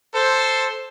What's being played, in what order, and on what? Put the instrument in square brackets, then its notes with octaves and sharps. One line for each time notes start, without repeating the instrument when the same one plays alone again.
[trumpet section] A4 C5